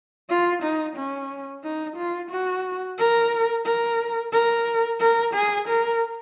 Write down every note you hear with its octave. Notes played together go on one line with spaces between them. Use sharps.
F4
D#4
C#4
D#4
F4
F#4
A#4
A#4
A#4
A#4
G#4
A#4